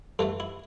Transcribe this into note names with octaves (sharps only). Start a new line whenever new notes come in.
G2 E3 A3 A4
E4